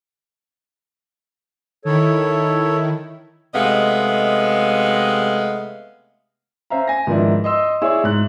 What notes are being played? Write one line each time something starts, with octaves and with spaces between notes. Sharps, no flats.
D#3 E4 A4 C#5
C3 G#3 A3 B3 D#5 F5
C#4 C5 E5 F5 A#5
G#5 A#6
G#2 D#3 F3 B3 D4 E4
D#5 C6 E6
E4 G#4 C#5 D5 E6
G#2 F#6